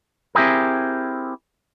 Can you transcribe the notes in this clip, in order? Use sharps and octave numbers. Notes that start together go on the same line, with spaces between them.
C4 E4 G4 G#4 A#4